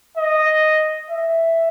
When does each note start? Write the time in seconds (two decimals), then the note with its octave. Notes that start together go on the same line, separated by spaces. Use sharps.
0.17 D#5
1.10 E5